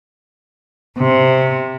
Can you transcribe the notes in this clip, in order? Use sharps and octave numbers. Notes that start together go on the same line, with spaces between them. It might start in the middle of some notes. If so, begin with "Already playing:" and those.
C3